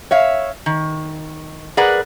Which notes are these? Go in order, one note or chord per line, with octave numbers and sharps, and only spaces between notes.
C#5 E5 F5
D#3
G#4 A#4 B4 D5 F#5